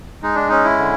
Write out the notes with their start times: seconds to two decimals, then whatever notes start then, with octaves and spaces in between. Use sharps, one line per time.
0.23 G#3 D#4
0.35 D4
0.49 C#4 D#4
0.64 E4
0.79 D3